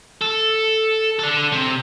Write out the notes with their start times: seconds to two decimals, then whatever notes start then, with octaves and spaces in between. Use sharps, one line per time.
0.21 A4
1.19 D4 A4
1.52 C3